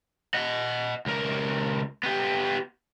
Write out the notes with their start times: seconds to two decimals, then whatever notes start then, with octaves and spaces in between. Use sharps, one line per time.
0.34 D#5 F#5
1.06 C#2 A#4
2.03 B3 G4